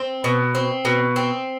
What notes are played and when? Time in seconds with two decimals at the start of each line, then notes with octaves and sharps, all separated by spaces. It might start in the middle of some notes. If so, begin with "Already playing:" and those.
Already playing: C4
0.24 B2
0.55 C4
0.85 B2
1.16 C4